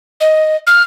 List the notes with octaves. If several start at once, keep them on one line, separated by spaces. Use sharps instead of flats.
D#5
F6